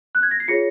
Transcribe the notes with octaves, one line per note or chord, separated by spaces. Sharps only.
F#6
G#6
A#6
C7
F4 G#4 C#5 A#6 C#7